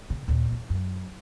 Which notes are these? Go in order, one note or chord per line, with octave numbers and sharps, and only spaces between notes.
C#3
D#2 A#2
E2
F#2